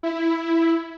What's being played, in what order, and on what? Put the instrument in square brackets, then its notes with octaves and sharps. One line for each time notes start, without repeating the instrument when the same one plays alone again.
[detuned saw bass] E4